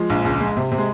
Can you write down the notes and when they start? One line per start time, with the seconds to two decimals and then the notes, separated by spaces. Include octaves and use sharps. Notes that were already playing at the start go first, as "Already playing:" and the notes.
Already playing: F3 G#3
0.10 A#1
0.25 C#2
0.41 G#3
0.57 C3
0.72 C3
0.78 G#3